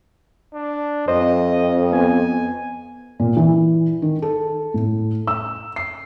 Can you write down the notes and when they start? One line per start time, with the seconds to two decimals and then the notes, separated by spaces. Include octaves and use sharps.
0.54 D4
1.08 F2 C5 D#5
1.92 B3 G#5
3.20 A#2
3.37 E3
4.02 D#3
4.22 A4
4.74 A2
5.27 E6
5.76 C7